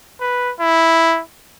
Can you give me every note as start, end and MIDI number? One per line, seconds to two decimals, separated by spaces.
0.21 0.53 71
0.60 1.21 64